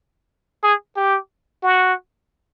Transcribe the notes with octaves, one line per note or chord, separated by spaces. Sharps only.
G#4
G4
F#4